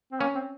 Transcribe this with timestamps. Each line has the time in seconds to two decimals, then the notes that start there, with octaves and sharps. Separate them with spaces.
0.12 C4
0.20 A#3 C#4
0.35 C4